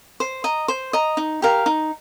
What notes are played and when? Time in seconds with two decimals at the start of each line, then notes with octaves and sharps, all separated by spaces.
0.20 C5
0.44 D#5 A#5
0.68 C5
0.93 D#5 A#5
1.17 D#4
1.42 G4 A#4 F5
1.66 D#4